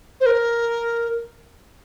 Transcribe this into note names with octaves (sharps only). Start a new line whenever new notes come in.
C5
A#4